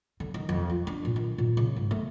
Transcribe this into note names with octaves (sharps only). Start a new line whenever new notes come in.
D3
D#3
F2
F3
D4
A#2
D#3
A#2
C#3
G#2
A3